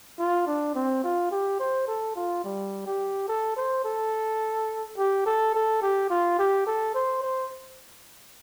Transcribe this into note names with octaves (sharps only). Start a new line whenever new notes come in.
F4
D4
C4
F4
G4
C5
A4
F4
G3
G4
A4
C5
A4
G4
A4
A4
G4
F4
G4
A4
C5
C5